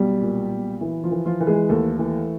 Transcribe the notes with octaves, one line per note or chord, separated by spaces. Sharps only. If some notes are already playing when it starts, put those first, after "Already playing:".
Already playing: B1 G3 G4
A#2
B1
E3 E4
F3 F4
E3
F3 F4
E3
G#3 G#4
D#2 A3 A4
E3